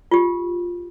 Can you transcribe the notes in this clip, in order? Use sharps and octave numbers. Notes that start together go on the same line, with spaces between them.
F4 G4